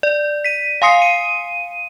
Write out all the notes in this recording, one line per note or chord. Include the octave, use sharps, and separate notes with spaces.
D5
B6 D#7
F5 G#5 C6 D#6 C7 C#7
D#7